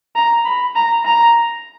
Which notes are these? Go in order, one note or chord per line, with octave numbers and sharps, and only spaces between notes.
A#5
B5
A#5
A#5